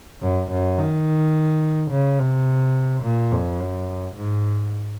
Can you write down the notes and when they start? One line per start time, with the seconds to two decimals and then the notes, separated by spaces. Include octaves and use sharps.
0.22 F#2
0.51 F#2
0.78 D#3
1.91 C#3
2.19 C3
3.03 A#2
3.32 F2
3.61 F#2
4.16 G#2